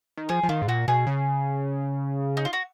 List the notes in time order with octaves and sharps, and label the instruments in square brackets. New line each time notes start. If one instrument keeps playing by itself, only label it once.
[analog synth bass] D#3
[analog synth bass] F3 [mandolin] G#4
[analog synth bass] F3
[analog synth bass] D#3 [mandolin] F4
[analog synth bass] G#2
[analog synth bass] A#2 [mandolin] F#4
[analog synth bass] B2 [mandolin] G#4
[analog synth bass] C#3
[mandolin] D#4
F4
F#4